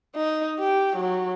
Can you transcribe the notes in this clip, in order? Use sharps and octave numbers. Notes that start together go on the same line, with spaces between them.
D#4
G4
F#3